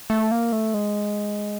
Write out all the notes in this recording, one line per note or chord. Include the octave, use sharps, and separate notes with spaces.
A3
A#3
A3
G#3